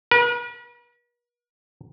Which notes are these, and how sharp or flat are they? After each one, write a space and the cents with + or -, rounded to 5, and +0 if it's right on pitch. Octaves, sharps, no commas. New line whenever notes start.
B4 -45